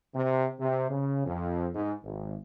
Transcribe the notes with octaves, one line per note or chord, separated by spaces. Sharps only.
C3
C3
C#3
F2
G#2
G#1